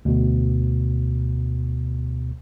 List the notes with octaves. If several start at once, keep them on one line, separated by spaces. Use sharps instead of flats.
D2 B2